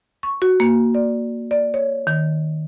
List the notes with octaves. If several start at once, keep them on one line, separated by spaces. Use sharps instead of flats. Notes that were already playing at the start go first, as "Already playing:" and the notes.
C#6
F#4
A#3
D5
D5
C#5
D#3